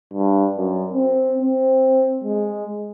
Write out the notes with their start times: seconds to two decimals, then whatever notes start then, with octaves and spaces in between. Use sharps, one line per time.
0.14 G2
0.57 F#2
0.93 C4
1.42 C4
2.24 G#3